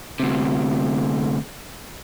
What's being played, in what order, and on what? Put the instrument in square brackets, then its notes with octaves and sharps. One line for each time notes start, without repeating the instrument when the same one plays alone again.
[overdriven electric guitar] D2 C3